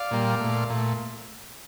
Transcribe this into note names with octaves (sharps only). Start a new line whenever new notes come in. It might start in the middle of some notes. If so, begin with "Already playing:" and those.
Already playing: D5 F5
A#2 G3 A#3
A#2 A3
A#2 A3